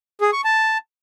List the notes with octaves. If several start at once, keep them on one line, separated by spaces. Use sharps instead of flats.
G#4
C#6
A5